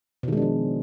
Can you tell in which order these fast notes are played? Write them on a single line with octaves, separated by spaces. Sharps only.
B2 D#3 G#3 D4 F3